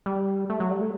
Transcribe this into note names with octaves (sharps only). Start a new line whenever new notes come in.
G3
A3
F#3
G3
A3